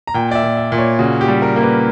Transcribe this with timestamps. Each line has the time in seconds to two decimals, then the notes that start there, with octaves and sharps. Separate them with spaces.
0.07 A#5
0.14 A#2 G5
0.31 D5
0.35 E5
0.43 A#2
0.57 E5
0.72 A#2
0.78 C#5
0.99 C#3 F#4
1.21 G4
1.28 G3
1.42 A#4
1.56 A#3
1.63 B4